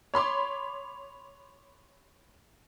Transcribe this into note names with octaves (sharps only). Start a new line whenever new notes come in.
C#5 B5 C6 D6